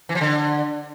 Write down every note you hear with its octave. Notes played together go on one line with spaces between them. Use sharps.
E3
F3
D3